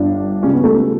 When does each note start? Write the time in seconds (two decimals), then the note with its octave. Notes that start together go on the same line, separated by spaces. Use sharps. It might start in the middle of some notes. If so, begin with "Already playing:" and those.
Already playing: G1 G2 D4
0.43 C#2 C#3 G3 C#4
0.53 B3
0.64 A3